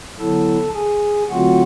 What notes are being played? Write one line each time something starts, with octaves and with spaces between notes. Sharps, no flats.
D3 F#3 B3 E4 A4 A5
G#4 G#5
D3 F#3 A3 C4 F4 F#4 F#5